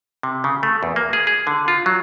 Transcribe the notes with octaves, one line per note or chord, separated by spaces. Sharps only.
C3
C#3
A3
E2
A#3
G#4
G#4
D3
F4
F#3